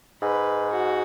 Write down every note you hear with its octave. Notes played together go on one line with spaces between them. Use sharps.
G#2 B4
F#4